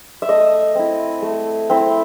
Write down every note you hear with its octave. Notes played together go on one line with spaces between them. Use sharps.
E5
A3 D#5
C4 E4
A3
C4 E4